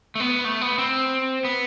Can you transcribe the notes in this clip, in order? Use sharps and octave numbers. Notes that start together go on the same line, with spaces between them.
A3
B3
A3
B3
C4
B3